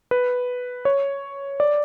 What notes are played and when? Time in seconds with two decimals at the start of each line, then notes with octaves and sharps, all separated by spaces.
0.11 B4
0.85 C#5
1.60 D5